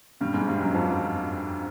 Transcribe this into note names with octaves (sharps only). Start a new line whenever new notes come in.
G2 G3
G#2 G#3
G2 G3
F#2 F#3
F2 F3